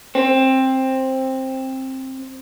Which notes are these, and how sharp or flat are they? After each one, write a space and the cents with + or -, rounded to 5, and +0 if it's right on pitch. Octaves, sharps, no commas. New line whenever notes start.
C4 +15